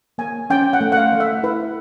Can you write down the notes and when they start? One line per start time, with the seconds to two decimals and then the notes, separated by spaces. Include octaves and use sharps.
0.18 A#3 G#5
0.50 C#4 G5
0.73 F#5
0.81 A3
0.92 F#5
0.97 F5
1.12 A3
1.20 E5
1.43 E4 B4